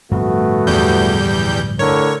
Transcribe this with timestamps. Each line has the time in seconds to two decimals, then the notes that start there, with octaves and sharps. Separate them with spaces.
0.11 D1 G2 F3 A3 B3 F#4
0.67 E2 G3 G6
1.79 A2 D3 A#4 C#5